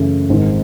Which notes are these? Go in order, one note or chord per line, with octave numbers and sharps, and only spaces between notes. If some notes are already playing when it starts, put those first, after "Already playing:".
Already playing: F#2 C#3 E3 A3
G#1 G#2 D#3 G#3